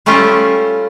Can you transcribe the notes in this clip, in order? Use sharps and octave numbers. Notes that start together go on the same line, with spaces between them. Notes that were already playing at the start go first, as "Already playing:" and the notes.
G3 A3 C#4 E4 F4 G4